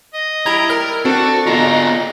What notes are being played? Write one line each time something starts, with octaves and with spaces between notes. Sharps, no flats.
D#5
G3 E4 A#5 B5 G#6
A#4 F6
C4 D4 F#4 A4
G#3 B3 D4 F4 A#5